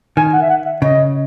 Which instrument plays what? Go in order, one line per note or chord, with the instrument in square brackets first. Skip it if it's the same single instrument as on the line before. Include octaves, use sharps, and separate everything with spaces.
[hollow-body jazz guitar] D#3 [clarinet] G#5
[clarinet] F#5
E5
F#5
E5
[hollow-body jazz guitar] C#3 [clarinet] D#5